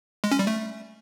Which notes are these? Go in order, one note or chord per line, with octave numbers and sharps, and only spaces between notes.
G#3
C#4
G3
A3